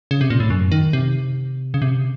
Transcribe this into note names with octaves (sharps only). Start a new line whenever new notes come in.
C#3
C3
A#2
A2
F#2
D#3
C3
C#3
C3